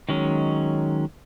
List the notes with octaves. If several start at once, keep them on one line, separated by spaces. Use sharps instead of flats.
D#3 F#3 G#3 C#4